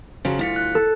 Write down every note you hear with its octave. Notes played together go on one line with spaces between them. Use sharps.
C#3 F3 F#3
D2 E4 F4 B6 C#7
F#6
A4